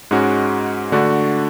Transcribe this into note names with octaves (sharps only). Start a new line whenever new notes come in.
G#2 G#3 C#4 F#4
D3 A3 D4 F#4